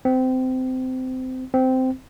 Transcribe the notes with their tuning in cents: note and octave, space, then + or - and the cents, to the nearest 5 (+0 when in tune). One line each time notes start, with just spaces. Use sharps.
C4 -25
C4 -15